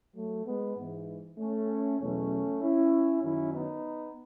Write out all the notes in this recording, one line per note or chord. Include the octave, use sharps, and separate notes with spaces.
F#3 A3
G#3 B3
G#2 E3
A3 C#4
E2 B2 F#3 A3 C#4
C#4 E4
F#2 D#3 F#3 C#4 E4
B3 D#4